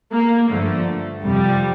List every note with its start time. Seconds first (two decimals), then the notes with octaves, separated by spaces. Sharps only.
0.13 A#3
0.50 G2 D3 F3 A3
1.23 F2 C3 F3 G3